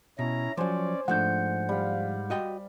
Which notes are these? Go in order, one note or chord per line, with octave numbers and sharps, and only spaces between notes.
B2 C#4 E4 A#5
F3 F#3 C#4 C5 D5 G#5
G#2 F3 A3 D4 F#5 G6
G3 F5
F#4 D#5 G5